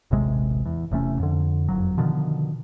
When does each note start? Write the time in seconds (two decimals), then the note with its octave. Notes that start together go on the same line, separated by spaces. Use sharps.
0.11 D#1 A1 C3 G#3
0.65 E2
0.91 E1 C3 A3 C#4
1.20 F2 D3
1.68 F#1 F2 F#3
1.98 B2 D3 D#3 F3